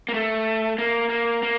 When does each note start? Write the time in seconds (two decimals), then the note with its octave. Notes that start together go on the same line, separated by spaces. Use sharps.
0.09 A#3
0.14 A3
0.78 A#3
1.09 A#3
1.43 A#3